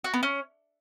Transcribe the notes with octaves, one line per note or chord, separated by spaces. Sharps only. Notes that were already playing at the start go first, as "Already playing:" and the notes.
F#4
B3
C#4